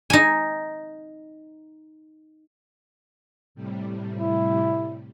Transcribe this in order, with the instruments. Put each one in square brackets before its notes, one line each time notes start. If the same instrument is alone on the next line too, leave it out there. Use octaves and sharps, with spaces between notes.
[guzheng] D#4 G#5
[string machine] A2 C3 G3
[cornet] E4